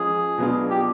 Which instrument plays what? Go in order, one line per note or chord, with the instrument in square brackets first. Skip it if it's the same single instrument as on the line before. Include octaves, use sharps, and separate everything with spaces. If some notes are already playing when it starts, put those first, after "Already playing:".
Already playing: [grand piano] F3 G#3 C#4 F4 [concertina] G#4
[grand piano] B2 F#3 B3 D4 F4
[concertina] G4